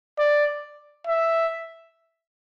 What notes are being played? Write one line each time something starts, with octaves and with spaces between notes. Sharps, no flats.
D5
E5